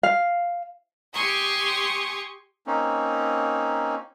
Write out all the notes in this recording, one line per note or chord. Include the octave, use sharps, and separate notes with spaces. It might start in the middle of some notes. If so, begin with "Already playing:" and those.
F5
G4 G#5 C6 C#6 D#6
A#3 C4 C#4 D#4